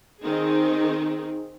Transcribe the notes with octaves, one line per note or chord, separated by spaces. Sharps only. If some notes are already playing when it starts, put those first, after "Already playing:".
D#3 C4 D#4 G#4